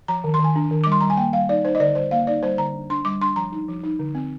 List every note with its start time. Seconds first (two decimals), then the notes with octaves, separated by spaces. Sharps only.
0.08 F3 A#5
0.24 D#3
0.34 C6
0.40 D#3 G#5
0.56 D4
0.71 D#3
0.84 G3 D6
0.92 C6
1.01 G3 A#5
1.10 G#5
1.17 A#3 G5
1.33 G3 F5
1.49 D#4 D5
1.65 D#4 C5
1.75 D#5
1.80 D3 D5
1.95 G3 C5
2.11 A#3 F5
2.27 D#4 D5
2.43 G3 C5
2.58 D3 A#5
2.74 D4
2.90 D4 C6
3.05 G3 D6
3.22 D4 C6
3.36 F3 A#5
3.52 D#4
3.69 F3
3.84 D#4
3.99 D3
4.15 C4